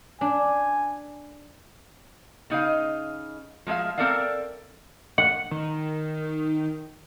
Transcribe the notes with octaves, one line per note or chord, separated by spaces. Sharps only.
D4 G#5
C#3 D#4 D#5 F5
F3 G#3 A4 E5 F5
C4 A4 A#4 D5 E5 F5
F#5
D#3